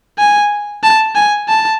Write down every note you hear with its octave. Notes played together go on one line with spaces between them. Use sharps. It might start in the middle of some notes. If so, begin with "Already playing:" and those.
G#5
A5
G#5
A5